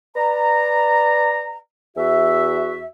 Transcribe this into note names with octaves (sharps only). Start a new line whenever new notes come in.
B4 D5 A#5
E2 F#4 E5